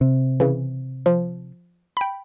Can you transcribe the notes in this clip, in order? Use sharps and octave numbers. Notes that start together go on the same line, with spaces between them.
C3
C#3 E3
F3
G5 B5